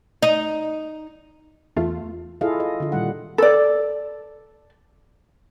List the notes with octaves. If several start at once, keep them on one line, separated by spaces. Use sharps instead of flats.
D#4
E2 A3 F4
E4 F4 G#4 A4 D#5 F5
D#5
D3 F4
A#2 D#3 G3 F#5
A4 D5